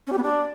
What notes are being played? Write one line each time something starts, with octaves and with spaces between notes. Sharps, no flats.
C#4
G4
B3
D4